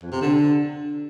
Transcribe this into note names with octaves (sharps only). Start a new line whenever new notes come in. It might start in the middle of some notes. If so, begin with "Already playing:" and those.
F2
C3
D3